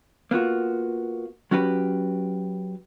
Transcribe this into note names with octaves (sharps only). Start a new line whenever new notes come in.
A#3 B3 F4 F#4
F#3 C#4 F#4 G4 B4